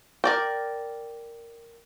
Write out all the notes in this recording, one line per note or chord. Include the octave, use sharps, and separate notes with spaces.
A#4 D5 G5